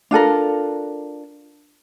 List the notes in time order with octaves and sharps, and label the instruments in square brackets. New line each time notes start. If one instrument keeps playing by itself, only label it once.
[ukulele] D4 F4 A4 A#4